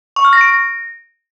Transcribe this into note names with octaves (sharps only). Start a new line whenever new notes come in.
C#6
F6
A#6
D7
A#6